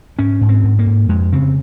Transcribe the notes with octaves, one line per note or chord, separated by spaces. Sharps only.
G#2 C#4
G#2
C4
G#2
A#3
G#2
F2 G#3
C#3 C4